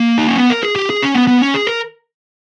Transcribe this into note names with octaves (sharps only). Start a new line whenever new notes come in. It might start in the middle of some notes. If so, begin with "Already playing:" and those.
Already playing: A#3
D#4
C#4
B3
A#4
G#4
G4
G#4
C#4
B3
B3
C#4
G#4
A#4